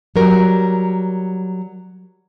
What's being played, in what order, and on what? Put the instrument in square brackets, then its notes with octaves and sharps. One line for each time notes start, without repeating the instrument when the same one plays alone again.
[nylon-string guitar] F#3 G3 A#4